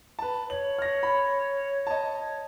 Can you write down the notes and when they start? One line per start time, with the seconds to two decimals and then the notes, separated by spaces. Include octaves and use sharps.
0.19 B4 A5
0.50 C#5 F#7
0.79 F6 A#6
1.03 B5
1.87 D#5 A5